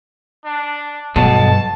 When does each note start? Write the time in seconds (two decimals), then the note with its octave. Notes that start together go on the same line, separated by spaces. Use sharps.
0.45 D4
1.16 B1 G2 B2 A5